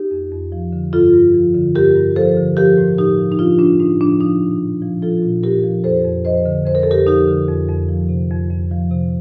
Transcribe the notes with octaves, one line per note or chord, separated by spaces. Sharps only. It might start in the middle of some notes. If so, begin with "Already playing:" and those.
Already playing: D#4 G4
F2
F2
F3
D3
G2 F4 A4
G2
F3
D3
G2 G4 A#4
G2
F3 A4 C5
D3
F3 G4 A#4
A2
A2 D#4 G4
F3
D#4
F3 D4 F4
A2 D4
A2 D#4
F3 D4
F3 D#4
A#2
A#2
F3
F3 F4 A4
A#2
A#2 G4 A#4
F3
F2 A4 C5
F2
F3 C5 D#5
D3
F2 C5
A#4
A4
F2 G4 A#4
F3 D#4 G4
D3
F2
F2
F3
C3
F2
F2
F3
C3